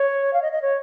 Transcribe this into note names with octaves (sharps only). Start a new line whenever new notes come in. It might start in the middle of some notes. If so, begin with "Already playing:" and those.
Already playing: C#5
F5
D#5
D#5
C#5